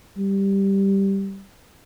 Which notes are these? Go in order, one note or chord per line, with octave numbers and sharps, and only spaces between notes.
G3